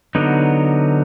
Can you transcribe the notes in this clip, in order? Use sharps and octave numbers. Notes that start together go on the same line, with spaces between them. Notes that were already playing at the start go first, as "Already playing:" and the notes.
D3 F#3 B3 D#4